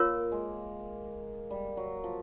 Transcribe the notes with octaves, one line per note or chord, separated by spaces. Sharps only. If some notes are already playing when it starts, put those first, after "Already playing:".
Already playing: A#3 F4 A#4 C#5
G#3
G3
F#3
F3